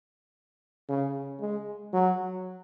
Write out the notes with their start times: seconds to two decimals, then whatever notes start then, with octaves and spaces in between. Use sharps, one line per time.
0.89 C#3
1.41 G#3
1.93 F#3